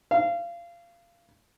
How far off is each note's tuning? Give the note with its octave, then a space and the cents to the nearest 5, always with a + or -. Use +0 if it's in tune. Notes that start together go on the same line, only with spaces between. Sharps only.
F5 -25